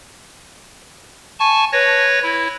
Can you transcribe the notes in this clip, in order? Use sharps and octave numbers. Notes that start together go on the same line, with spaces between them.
G#5 A5 C#6
B4 C#5 A#6
E4